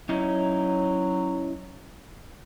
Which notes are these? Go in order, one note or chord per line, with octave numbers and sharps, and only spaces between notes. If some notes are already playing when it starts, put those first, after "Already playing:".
F#3 C#4 D#4 E4